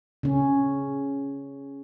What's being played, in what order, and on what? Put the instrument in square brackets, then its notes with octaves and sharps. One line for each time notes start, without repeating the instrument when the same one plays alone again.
[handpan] C#3 C#4